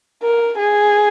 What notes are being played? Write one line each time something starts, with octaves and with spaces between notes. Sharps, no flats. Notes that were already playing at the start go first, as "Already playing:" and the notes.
A#4
G#4